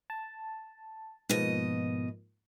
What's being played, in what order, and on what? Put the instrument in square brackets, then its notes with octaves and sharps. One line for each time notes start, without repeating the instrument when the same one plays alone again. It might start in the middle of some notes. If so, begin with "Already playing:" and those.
[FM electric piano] A5
[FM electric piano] G#2 F3 A#3 [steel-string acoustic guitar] B2 D#5